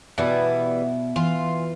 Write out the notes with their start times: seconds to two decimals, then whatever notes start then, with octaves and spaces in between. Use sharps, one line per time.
0.18 B2 E3 G3 B3 E4
1.16 E3 F4